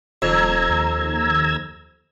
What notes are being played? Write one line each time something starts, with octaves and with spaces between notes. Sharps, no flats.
D#1 F2 A#5 E6 G#6
D#2